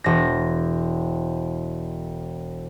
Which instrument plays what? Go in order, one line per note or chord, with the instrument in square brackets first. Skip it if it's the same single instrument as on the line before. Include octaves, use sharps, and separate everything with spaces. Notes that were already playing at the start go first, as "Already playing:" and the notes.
[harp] E1 A#6